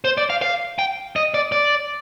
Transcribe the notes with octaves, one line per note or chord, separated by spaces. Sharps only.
C5
D5
F5
F5
G5
D#5
D5
D5